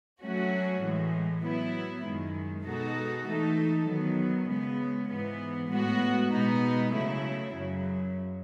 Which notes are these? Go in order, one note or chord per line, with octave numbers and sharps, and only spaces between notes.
F#3 A3 C#4 F#4
A2 E3 G#3
F#3 B3 E4
F#2 D#3 G#3
B2 G#3 D#4 F#4 A4
E3 A3 D#4 A4
D#3 F#3 B3
C#3 G#3 B3
G#2 E3 B3
A2 G#3 B3 F#4
B2 G#3 B3 D#4
C#3 F#3 A3 E4
F#2 C#3 F#3